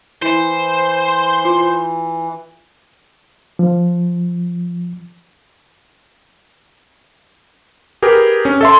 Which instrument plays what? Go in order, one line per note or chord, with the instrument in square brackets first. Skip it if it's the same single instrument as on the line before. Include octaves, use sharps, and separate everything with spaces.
[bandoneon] E3 [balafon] E4 [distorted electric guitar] C5
[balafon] F4
[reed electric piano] F3
[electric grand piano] G4 G#4 A#4 B4
C#4
A4 E5 C6